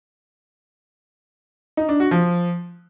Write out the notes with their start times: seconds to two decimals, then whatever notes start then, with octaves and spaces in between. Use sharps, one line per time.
1.77 D#4
1.89 D4
2.00 F#4
2.11 F3